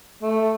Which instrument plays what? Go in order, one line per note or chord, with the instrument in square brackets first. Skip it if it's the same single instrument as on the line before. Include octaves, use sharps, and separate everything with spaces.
[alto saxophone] A3